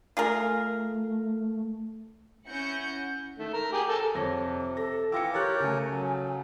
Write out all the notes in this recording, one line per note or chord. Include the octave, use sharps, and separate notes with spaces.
A3 F4 G#4 A#4
C#4 E4 F#5 G6 A#6 C#7
D#3 A3
A#4
G4 G#4
A4 A#4
F2 C3 C#5 A#6
A4 A#6
E3 F4 G5 D6 E6 A#6 C#7
G4 A#4 C#5 F#6 A6
C#3 A3 G#5
F#3